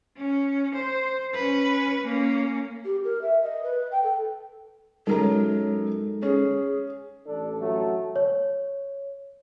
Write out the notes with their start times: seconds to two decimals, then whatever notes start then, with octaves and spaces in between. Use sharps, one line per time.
0.17 C#4
0.75 C5
1.34 C#4 B4
2.03 A#3 C#4
2.85 G4
3.04 A#4
3.22 E5
3.42 D#5
3.63 B4
3.91 G5
4.03 A4
5.07 F#2 F#3 G#3 D#4 A4 A#4 A#5
6.22 C#4 G#4
7.27 A1 D4 A4
7.61 F#3 A3
8.16 C#5